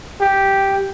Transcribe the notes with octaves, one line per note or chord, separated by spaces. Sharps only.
G4